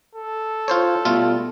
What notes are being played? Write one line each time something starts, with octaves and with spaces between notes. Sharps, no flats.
A4
F4 C5 C#5
B2 G3 A3 F4